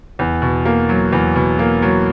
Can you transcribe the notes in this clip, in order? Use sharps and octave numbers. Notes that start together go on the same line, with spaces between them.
E2
B2
A#3
F#3
E2
B2
A#3
F#3